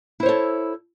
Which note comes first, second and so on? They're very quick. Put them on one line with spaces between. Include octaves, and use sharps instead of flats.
E4 C5 C#5 A4